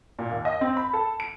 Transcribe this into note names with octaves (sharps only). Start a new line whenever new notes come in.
A#2
D#2
D#5
C4
B5
A4
D7